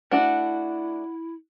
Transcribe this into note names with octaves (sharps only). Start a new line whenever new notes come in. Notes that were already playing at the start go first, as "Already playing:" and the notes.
A3 D4 E4 F#4 F#5